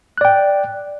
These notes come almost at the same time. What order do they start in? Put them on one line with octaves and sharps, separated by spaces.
F#6 D5 G5